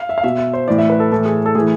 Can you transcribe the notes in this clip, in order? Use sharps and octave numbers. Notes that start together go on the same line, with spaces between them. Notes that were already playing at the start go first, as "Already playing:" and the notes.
Already playing: F5
E5
F5
B2 E5
E5
C5
A2 E3 D5
E5
B4
A4
A2 E3 A4
G#4
A4
A2 E3 G#4